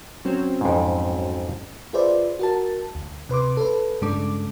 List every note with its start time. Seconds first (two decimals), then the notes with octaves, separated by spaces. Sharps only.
0.25 F#3 C4 C#4
0.61 F2 G#2
1.93 F4 G#4 B4 C5 D5 E5
2.39 F#4 A#4 A5
2.95 D2
3.29 C3 B4 C6 D6
3.57 A4 B4
4.02 G2 C#3 G#3 D4 A4 D6